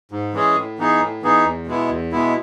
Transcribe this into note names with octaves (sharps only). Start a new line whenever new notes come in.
G#2
E3 G#3 C#4 G#4
A2
E3 B3 D#4 G#4
A2
E3 B3 D#4 G#4
E2
B2 G#3 B3 E4
E2
B2 G#3 B3 E4